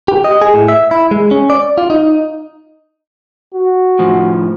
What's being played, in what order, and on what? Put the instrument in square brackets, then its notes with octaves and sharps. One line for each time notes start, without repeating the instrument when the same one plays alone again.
[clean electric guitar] G4
D#5
G#4
A2
E5
E4
G#3
C#4
D5
F4
D#4
[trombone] F#4
[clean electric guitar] A2 D#3 F3